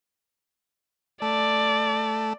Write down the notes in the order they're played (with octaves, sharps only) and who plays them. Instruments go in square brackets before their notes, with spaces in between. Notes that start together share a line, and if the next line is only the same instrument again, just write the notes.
[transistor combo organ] A3 [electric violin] D5